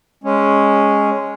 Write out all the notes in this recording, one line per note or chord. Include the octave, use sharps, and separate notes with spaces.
G#3 C#4